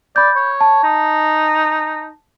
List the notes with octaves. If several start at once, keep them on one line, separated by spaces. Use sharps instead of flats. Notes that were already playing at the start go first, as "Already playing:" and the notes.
D5 B5 G6
C#5
A5
D#4